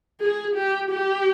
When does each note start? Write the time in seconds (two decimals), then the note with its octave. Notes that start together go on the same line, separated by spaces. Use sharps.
0.20 G#4
0.56 G4
0.91 G4